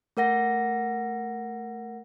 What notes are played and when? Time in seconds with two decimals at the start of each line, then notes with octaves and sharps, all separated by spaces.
0.17 A3 A#4 F#5 A#6